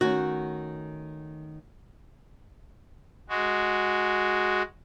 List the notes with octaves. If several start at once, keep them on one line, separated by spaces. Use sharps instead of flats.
D#3 A3 C#4 F#4
G#3 F#4